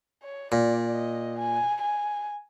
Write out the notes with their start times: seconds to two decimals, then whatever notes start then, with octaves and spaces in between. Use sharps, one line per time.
0.23 C#5
0.52 A#2 D5
0.95 D#5
1.39 G#5
1.82 G#5